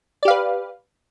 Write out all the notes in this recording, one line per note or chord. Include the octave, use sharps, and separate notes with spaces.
G4 B4 D5 F5